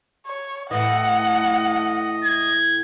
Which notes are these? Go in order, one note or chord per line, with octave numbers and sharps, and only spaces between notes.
C#5
A2 E3 D#5 F#5
G#6